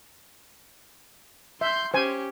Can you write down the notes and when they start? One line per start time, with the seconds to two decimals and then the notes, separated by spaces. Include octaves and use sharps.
1.61 E5 C6 G6
1.94 C#4 G4 C5 G#5